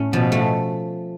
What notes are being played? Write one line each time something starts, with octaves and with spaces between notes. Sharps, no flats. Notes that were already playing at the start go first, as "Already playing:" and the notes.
Already playing: A2 A3 C#4
B2 F3
A3